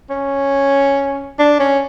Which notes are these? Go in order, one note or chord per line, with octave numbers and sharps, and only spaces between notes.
C#4
D4
C#4